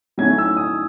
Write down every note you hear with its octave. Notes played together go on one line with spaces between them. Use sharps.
F#3 A3 C#4 E4 G#6
E6
D#6